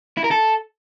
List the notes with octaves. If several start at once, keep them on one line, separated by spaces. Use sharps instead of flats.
E4
A#4
A4